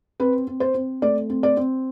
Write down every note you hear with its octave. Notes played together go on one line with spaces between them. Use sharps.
C4 B4
C4
C5
C4
A3 D5
C4
D5
C4